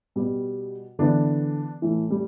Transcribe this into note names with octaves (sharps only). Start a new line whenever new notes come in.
B2 G3 B3 G4
D3 E3 B3 D4
A2 E3 A3 E4
G3